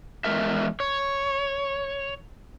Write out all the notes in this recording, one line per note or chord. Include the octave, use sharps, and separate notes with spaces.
E2 G2 G#3 A#4 E5
C#5